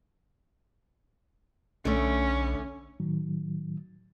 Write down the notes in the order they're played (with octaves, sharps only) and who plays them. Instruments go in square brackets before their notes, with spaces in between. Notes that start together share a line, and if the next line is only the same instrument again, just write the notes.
[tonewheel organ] B1 [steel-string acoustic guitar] D3 A3 [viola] C#4
[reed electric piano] A2 D#3 F#3